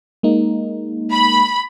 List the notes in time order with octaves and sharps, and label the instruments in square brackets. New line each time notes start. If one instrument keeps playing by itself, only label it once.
[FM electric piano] G#3 A#3 D#4
[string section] B5